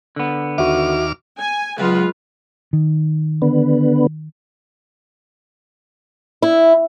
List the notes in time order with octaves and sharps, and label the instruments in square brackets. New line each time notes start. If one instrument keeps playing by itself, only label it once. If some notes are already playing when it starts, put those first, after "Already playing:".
[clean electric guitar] D3 B3
[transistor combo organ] D#2 D6 F6 [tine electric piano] F#4 E5
[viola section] G#5
[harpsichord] C#2 F#2 [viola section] G#3 F4 B4
[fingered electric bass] D#3
[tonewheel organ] D3 B3
[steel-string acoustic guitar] E4